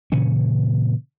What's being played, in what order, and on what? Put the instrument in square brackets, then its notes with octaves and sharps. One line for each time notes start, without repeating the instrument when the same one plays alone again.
[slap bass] A#2 C#3 E3 C#4